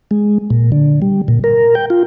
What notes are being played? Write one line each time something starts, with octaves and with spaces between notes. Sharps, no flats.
G#3
A#2
D3
G3
A#2
A#4
G5
F4